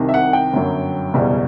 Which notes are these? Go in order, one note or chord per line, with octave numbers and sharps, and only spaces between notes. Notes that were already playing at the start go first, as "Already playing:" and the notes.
Already playing: C2 C3 D#3
E5
F#5
G5
G1 F#2 F#3
F#1 E2 B2 G3